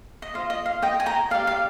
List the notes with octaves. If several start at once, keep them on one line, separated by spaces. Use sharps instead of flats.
D#5
F4 C5 D#5 F5
D#5
F5
D#5 G5
G#5
G5 A#5
G4 D5 F5
F5